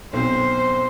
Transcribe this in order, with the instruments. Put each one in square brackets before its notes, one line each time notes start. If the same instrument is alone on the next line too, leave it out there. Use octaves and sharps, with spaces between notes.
[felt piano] B1 C4 [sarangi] C5